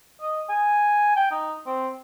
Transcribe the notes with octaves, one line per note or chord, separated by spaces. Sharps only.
D#5
G#5
G5
D#4
C4